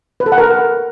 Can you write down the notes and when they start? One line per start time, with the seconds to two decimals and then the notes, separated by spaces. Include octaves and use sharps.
0.20 B4
0.26 A4
0.32 F#5
0.38 A#4